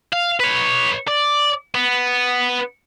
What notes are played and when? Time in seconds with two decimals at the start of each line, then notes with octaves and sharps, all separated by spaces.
0.13 F5
0.40 B4 C#5
1.08 D5
1.75 B3